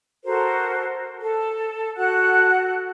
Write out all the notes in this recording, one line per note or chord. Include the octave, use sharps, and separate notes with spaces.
F#4 A4 A#4 C5
A4
F#4 A4 F#5 F#6